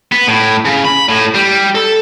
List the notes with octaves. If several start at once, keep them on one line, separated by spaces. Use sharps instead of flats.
B3
A2
C#3
B5
A2
G3
A4